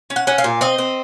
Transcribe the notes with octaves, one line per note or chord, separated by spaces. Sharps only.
C#4
F#5
C#4 F#5
F5
A#2
C4 D#5
C4